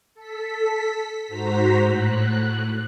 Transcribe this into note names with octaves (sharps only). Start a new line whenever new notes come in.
A4 B6
G#2 F#4 C5 A#5 B6
A2 F#6